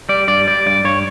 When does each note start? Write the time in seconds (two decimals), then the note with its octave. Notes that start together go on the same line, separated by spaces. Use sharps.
0.09 G3 D5
0.28 G2 D5
0.47 G3 D5
0.66 G2 D5
0.85 G2 C#5